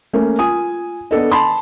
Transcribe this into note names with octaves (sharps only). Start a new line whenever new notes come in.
A3 A#3 C#4
F4 G#5 D#6
B3 D4 A4 D#5
A5 B5 C6